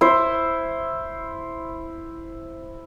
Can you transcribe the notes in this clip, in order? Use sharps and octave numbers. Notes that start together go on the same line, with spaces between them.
E4 C5